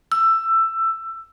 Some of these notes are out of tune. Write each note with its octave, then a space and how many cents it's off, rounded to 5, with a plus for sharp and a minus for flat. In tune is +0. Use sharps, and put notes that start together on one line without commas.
E6 +15